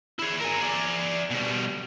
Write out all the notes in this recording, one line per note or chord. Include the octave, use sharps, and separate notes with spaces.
E4 G#4
A#4 G#5
G#4 D5
B2 G3